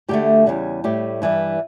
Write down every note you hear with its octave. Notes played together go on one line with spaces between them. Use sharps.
D2 D3 A3 G4
E2 C#3 G3
A2 G3 G4
G2 E3 G3